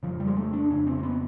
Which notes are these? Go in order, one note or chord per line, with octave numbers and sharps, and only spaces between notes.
F2 C#3 F3
G3
G#3
A3
D4
F2 C#3 C#4
C4
C4
B3